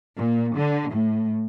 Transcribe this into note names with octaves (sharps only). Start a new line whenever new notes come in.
A#2
D3
A2